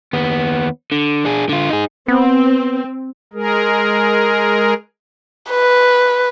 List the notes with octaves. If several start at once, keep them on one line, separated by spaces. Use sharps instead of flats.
D#2 B3
D3
D4 G#4
D3 F4
D#4 G#4
B3 C4
G#3 G#4 A#4
B4